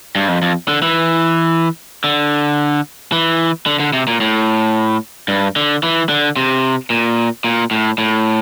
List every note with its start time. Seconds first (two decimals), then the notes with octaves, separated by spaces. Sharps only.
0.15 G2
0.28 F2
0.42 F2
0.68 D3
0.82 E3
2.04 D3
3.12 E3
3.66 D3
3.80 D3
3.93 C3
4.07 A#2
4.21 A2
5.28 G2
5.56 D3
5.83 E3
6.09 D3
6.36 C3
6.90 A#2
7.44 A#2
7.71 A2
7.98 A2